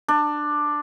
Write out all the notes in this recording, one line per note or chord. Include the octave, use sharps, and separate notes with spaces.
D4